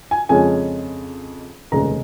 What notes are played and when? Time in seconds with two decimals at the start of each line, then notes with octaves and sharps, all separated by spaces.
0.11 G#5
0.29 F2 C#3 G#3 C#4 G#5
1.72 F1 D#2 C#3 G#3 A#5